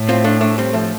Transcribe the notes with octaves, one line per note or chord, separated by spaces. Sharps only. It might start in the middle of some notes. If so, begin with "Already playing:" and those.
Already playing: A2
C4 F4
A3 D4
A3 D4
G3 C4
F3 A3